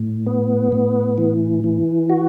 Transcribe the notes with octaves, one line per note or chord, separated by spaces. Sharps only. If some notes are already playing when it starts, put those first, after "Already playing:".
Already playing: A2
B3
A2
E3
E3
F#4